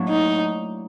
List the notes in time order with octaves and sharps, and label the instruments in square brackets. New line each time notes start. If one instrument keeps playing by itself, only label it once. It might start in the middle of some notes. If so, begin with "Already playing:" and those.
Already playing: [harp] A2 F#3 A#3 D4
[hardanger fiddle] D#4